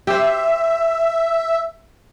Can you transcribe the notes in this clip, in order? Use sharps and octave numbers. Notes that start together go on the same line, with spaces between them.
G4 C5 E5